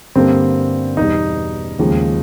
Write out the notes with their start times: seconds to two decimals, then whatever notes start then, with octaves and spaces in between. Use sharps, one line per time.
0.15 G2 D3 G3 A#3 C4
0.97 E2 B2 G3 D#4
1.79 D#2 C#3 F3 G#3